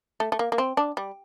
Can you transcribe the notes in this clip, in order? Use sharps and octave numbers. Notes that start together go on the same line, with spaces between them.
A3
A3
A#3
A#3
C4
D4
G3